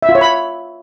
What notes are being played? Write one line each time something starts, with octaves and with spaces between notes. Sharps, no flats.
E5
F4
C#5
B5